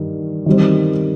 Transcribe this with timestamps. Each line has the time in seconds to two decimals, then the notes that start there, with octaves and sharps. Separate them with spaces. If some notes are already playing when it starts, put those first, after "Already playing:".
Already playing: G2 D#3 G3
0.46 D#3 G3 C4